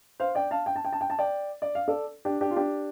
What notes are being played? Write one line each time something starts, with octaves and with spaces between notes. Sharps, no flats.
C5 F5
D5 G5
F5 A5
G5
A5
G5
A5
G5
A5
D5 G5
D5
F5
A4 D5
D4 G4
D4 G4
F4
D4 G4